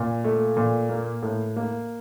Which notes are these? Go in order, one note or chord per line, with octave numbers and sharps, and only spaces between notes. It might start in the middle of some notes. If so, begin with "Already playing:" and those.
Already playing: A#2
A3
A#2
A#3
A2
A#3